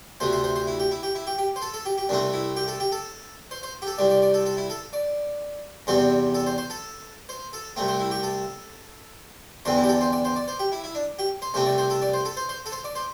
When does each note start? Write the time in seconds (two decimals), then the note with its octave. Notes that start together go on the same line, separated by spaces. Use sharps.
0.20 D2 C3 A3 C5
0.32 C5
0.44 C5
0.56 C5
0.67 E4
0.80 G4
0.91 E4
1.03 G4
1.15 E4
1.27 G4
1.38 G4
1.56 C5
1.62 A4
1.74 A4
1.86 G4
1.98 G4
2.09 C2 C3 A3 C4 D4
2.33 E4
2.56 G4
2.68 A4
2.80 G4
2.92 A4
3.51 C5
3.63 C5
3.82 G4
3.87 A4
3.98 C2 C3 G3 D5
4.10 D5
4.22 D5
4.34 A4
4.46 A4
4.57 E4
4.70 A4
4.93 D5
5.87 E2 C3 G3 C4 C5
6.34 A4
6.46 C5
6.58 C5
6.70 A4
7.29 C5
7.53 A4
7.76 C2 C3 A3 C4
7.88 C5
8.00 E4
8.11 G4
8.23 A4
9.65 E2 D3 C4 C5
9.77 E4
9.83 G4
9.89 A4
10.01 C5
10.12 D5
10.25 C5
10.36 D5
10.48 C5
10.59 G4
10.72 E4
10.84 E4
10.95 D4
11.19 G4
11.42 C5
11.54 C2 C3 A3 C4 C5
11.66 D5
11.78 C5
11.90 A4
12.02 D5
12.13 C5
12.25 A4
12.37 C5
12.49 C5
12.66 A4
12.72 C5
12.84 D5
12.95 C5